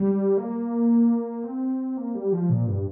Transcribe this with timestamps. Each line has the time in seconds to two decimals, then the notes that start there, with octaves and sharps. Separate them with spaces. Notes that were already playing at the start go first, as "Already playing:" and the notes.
Already playing: G3
0.38 A#3
1.44 C4
1.97 A#3
2.14 G3
2.32 F3
2.50 A#2
2.67 G2